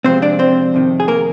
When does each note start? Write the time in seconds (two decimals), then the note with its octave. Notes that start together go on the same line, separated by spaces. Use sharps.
0.04 C3 F3 G#3 C4 C5
0.22 D4 D5
0.39 C4 C5
0.74 F2 C3 D#3
1.00 G#4
1.08 A#3 A#4